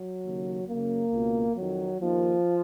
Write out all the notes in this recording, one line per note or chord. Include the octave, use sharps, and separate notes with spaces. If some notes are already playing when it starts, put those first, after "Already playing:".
Already playing: F#3
D#2 C#3
F#2 C#3 A#3
C#2 B2
F2 D#3 F#3
D#2 D#3 F3